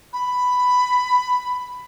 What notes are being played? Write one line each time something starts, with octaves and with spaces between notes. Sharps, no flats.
B5